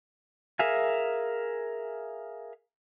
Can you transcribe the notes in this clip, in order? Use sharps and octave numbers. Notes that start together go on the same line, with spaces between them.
G#4 A#4 E5 F5 G#5